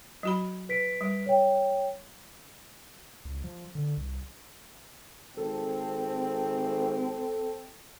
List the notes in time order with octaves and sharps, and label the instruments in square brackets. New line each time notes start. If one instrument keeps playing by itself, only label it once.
[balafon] F#3 F#4 B5
[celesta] B4 B6 D7
[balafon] G3
[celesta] C#5 G5
[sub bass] C#2
F3
D3
C2
[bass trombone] G#1 [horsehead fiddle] C4 [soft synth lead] A4